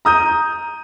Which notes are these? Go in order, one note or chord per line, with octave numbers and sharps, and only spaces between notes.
A#5 D#6 G6 D#7